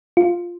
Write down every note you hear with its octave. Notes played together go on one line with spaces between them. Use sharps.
F4